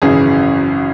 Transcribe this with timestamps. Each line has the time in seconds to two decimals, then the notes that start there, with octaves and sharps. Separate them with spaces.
0.02 G#1 F#2 C#3 E3 G#4